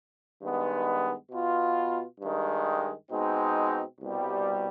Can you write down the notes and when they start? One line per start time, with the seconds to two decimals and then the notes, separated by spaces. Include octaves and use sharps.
0.42 G2 D#3 G#3 B3
1.31 B2 B3 F4
2.21 G2 D#3 G#3
3.11 B2 G#3 C4 D#4
4.01 C2 B2 G3